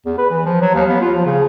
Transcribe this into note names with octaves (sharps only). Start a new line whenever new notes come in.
E2
B4
E3
F3
F#3
D#2
B3
F4
F3
C#3